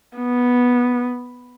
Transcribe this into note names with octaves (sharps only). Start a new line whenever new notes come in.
B3